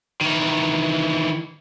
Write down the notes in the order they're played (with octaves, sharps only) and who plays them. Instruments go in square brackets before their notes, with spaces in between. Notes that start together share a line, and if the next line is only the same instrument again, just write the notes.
[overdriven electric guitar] D#3 E3